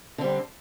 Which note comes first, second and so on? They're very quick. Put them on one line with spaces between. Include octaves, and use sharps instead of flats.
D3 C4 G3